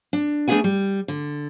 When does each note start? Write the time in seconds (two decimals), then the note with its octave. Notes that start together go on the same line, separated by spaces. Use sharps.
0.13 D4
0.48 A3 B3 D4 G#4 F#5 G#5
0.64 G3
1.08 D3